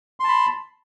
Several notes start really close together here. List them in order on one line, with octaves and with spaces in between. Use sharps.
C6 A5 B5